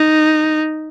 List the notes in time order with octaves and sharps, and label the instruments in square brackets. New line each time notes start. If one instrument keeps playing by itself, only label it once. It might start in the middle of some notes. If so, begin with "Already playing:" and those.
Already playing: [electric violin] D#4